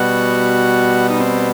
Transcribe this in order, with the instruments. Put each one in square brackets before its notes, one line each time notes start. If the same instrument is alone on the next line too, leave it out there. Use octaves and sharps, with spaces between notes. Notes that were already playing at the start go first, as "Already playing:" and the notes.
Already playing: [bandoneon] B2 G3 B3 [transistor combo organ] F#4
[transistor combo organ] D#4
C4